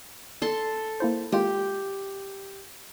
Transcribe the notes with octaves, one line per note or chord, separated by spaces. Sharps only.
A4 A5 C6
A#3 E4 C5
G#3 A#3 F4 G4